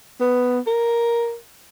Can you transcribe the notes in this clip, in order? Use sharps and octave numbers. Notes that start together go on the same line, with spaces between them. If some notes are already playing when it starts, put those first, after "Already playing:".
B3
A#4